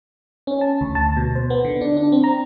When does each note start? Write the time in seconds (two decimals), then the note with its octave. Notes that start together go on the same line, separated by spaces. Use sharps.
0.47 C#4
0.61 A5
0.81 D2
0.95 A5
1.17 B2
1.35 C5
1.50 B3
1.65 D3
1.81 D4
1.97 D4
2.12 C4
2.24 A#5